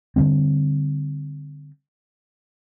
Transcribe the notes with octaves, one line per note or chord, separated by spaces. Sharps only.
D3 F3 G3 C4